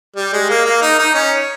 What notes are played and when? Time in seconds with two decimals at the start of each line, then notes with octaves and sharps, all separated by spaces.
0.16 G3
0.33 G#3
0.50 A#3
0.65 A#3
0.82 D#4
0.99 D#4
1.14 C#4